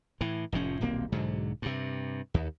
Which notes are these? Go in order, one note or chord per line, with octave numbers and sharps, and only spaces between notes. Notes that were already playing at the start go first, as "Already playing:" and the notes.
A2 E3
F1 A2 F3 C#4
D#1 B1 A#3 C4
B1 G#2 D3 F#3
G2 C3
D#2